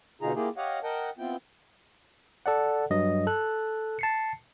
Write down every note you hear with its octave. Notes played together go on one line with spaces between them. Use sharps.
B2 D3 D#4 F4 G#4 A#5
A#3 E4 F4 G4 G#4
G4 C#5 D#5 F5 F#5
A#4 D#5 F#5 G5 A5
B3 C4 E4 F4 G5
A4 D5 F#5
G2 F#3 D#5
A4 F#6
A5 C7 C#7